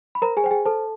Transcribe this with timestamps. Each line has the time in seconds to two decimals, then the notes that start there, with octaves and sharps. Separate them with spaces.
0.15 B5
0.22 A#4 C5 A#5
0.37 G#4 G#5
0.44 C5 G5
0.51 G#4 G#5
0.65 A4 C5 A5